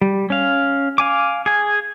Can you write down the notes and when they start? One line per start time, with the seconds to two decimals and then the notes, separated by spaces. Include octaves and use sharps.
0.02 G3
0.30 C#4 F5
0.98 F5 G#5 D6
1.46 G#4 G#5